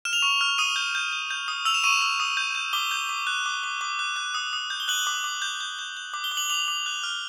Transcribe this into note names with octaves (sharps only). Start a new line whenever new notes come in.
F6 E7
F7
C#6 E7
F6
D#6 D#7
G6
G6
G6
G6
D#6
E6 F7
E7
C#6 D#7
E7
E6
D#6
G6
G6
D6 G7
G6
D6
F#6
D6
D6
D6
F#6
F#6
D#6
D#6
G6
G7
F#6 F#7
D6
D6
G6
G6
G6
G6
D6
G7
D6
F#7
D6 F7
D6
F#6
F6